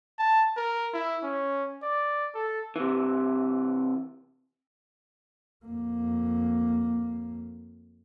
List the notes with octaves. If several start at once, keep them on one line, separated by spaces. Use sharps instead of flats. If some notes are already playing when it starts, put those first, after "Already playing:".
A5
A#4
E4
C#4
D5
A4
C3 E3
F2 A#3